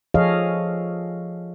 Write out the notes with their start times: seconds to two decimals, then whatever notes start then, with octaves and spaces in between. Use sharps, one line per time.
0.14 F3 G#4 A4 C#5 D#5 F5